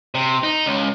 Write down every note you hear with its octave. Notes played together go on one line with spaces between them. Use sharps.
C3
D#4
C#2